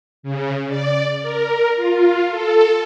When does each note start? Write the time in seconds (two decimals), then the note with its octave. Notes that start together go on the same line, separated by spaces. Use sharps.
0.23 C#3
0.68 D5
1.22 A#4
1.76 F4
2.30 A4